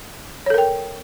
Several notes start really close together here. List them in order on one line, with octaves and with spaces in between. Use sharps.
C#5 A4 A#4 G5